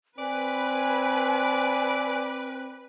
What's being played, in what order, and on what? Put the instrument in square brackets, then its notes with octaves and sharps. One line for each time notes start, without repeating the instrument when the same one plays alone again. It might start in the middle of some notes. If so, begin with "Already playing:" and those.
[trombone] C4 [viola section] B4 [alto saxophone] D5 [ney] G#5